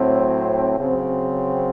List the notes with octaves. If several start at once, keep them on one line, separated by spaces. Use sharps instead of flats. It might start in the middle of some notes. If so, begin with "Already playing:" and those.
Already playing: A2 F#3 C4
C#3 F#3 C4